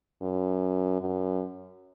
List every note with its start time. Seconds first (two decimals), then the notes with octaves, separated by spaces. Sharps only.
0.22 F#2
1.01 F#2